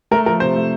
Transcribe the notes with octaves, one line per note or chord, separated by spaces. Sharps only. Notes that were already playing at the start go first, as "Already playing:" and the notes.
A3 A#4
F3 A#4
C3 C5
A3